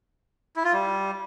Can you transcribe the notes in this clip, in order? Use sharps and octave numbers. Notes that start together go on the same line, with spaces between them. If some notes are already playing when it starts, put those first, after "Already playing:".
E4
F4
G3